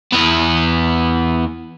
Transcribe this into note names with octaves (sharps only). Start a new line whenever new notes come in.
E2 B3